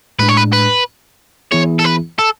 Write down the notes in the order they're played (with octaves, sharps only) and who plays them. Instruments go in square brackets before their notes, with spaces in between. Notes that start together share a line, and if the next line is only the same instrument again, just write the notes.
[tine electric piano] A2 G#3 D4 [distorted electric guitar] B4
[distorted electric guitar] C#5
B4
B4
[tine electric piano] E3 B3 E4 G#4 [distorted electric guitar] C#5
[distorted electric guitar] A4
B4
A4